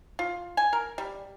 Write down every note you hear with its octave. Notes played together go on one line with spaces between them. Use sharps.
F4
G#5
A#4
G3